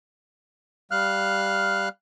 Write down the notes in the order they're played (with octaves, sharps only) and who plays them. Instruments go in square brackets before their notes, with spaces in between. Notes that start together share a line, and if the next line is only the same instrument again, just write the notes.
[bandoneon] G3 F5 F6 F#6